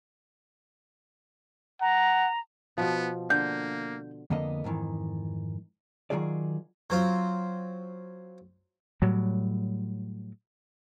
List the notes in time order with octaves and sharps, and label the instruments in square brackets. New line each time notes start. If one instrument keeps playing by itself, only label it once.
[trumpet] F#5 [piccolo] A#5
[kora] B2 F3 [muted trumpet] B3
[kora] D3 [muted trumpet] A#3 [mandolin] G6
[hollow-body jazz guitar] F2 D3 A#3 B3 D#5
F2 G#2 D#3 E3
D#3 F3 F#3 F4 G#4 D5
[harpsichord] F#3 C4 F4
[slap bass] A2 F#3 G3